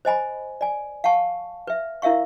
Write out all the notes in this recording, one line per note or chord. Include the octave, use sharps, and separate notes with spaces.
C5 D#5 G#5 B5
D5 G#5
F5 F#5 A5 C#6
B4 E5
E4 A#4 E5 F5 C#6